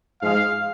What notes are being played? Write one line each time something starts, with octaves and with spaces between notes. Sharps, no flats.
G#2 F3 G#3 F5